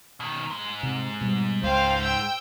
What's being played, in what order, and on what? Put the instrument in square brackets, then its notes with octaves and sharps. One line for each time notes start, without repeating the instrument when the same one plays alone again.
[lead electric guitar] B2 D#3
G#2 G#3
[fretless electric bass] C3
B2 G3
[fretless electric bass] C#2 [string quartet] C5 F5 G5
[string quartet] G5 E6